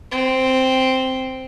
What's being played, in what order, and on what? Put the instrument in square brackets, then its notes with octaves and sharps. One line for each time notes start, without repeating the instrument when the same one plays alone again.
[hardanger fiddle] C4